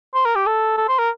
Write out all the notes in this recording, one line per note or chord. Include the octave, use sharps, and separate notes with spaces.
C5
A#4
G4
A4
A4
C5
A#4